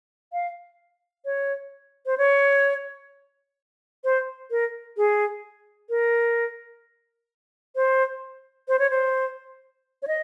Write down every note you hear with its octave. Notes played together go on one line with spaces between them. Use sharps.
F5
C#5
C5
C#5
C5
A#4
G#4
A#4
C5
C5
C#5
C5
C#5
D#5